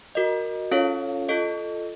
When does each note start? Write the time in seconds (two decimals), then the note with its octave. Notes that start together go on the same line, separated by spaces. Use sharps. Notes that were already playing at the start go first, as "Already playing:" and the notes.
0.15 F#4 A#4 D#5
0.72 C#4 F4 A4 C#5 F5
1.29 F4 A4 D#5